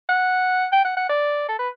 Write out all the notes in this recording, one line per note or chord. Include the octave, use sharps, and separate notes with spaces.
F#5
G5
F#5
F#5
D5
A4
B4